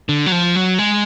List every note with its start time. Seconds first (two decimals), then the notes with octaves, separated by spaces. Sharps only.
0.09 D3
0.26 F#3
0.32 F3
0.56 F#3
0.79 G#3